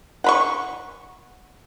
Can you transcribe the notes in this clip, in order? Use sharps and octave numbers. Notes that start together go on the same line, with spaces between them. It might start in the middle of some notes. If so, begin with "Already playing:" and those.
F#5 B5 C#6